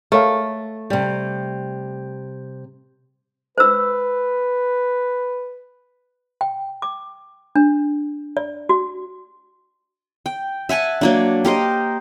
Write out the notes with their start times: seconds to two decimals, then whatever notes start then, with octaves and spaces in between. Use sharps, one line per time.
0.12 A3 A#4 C#5 F5
0.90 C3 G3
3.58 B4 C5 E6
6.41 G5
6.82 D6
7.56 D4
8.37 D5
8.69 F#4
10.26 G5
10.69 E5 F#5 G#5 A5
11.01 F#3 A#3 D4
11.45 G4 A#4 C5 D#5